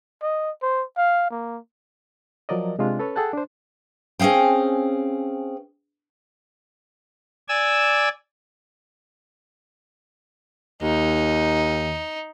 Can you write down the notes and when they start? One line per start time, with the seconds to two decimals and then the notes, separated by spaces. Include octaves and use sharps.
0.22 D#5
0.62 C5
0.97 F5
1.30 A#3
2.49 F3 F#3 A#4 D5 D#5
2.79 C3 G#3 D4 F4
2.99 C#4 A4 B4 C#5
3.16 G#4 A4 F#5 G5 A5 F#6
3.33 D4 C5
4.19 C4 C#4 G#4 F5 G5
7.48 D5 G#5 E6
10.82 D#2 D#4